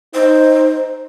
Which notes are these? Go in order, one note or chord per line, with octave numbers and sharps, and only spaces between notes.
D#4 C5